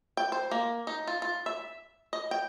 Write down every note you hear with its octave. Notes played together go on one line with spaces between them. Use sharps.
G5
C5
A#3
D#4
F4
F4
E5
D#5
G5